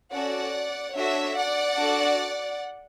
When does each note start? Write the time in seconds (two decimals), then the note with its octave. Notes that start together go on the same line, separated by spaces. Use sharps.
0.13 C#4 F#4 A4 D5 F#5
0.95 D4 F#4 A4 C#5 E5
1.37 D5 F#5
1.78 D4 F#4 A4